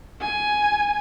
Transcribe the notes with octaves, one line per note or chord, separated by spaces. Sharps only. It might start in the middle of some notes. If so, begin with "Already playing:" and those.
G#5